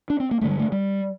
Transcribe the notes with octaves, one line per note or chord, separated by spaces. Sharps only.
D4
C4
A#3
G2 D3 A3
G3
A3
G3